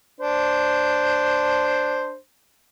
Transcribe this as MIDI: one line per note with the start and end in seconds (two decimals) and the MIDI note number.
0.21 2.15 62
0.21 2.15 72